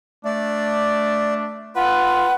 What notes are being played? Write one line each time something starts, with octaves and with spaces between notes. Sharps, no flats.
A3 D4 D5
F4 B4 F#5